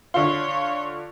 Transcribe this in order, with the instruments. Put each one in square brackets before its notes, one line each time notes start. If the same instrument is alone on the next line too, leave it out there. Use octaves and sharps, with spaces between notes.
[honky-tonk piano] D3 F4 [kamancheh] C#5 [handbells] C6